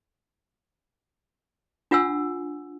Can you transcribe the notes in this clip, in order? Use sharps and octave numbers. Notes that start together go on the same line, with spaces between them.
D4 F4 F#5 G#5 E6